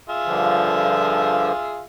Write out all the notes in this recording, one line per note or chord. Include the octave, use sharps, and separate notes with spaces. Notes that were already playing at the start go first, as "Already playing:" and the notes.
F4 G#4 E5
G2 D3 F3